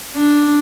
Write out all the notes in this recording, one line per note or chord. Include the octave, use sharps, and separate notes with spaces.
D4